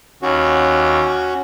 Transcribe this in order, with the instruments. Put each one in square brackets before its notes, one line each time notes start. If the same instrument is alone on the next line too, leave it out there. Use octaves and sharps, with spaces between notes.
[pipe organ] D#2 [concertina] C#4 F#4